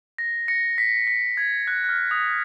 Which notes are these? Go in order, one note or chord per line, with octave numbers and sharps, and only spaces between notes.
A#6
A#6 C#7
B6
B6
G#6
F#6
F#6
F6
D#6